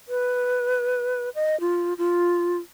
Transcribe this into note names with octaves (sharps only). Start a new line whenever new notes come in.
B4
D#5
F4
F4